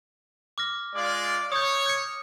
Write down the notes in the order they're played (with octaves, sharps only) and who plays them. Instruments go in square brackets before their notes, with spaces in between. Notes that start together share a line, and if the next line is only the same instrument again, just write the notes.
[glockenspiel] D6 F6 A#6
[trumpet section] G#3 F4 D5
[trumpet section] C#5 [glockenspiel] D#6 G6
[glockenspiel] G6 C#7